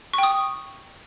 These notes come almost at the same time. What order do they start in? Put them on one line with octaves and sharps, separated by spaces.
C#6 G5 D#6